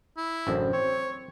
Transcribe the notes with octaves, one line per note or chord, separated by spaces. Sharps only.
E4
A1 F#2 D3 C5
C4 C#5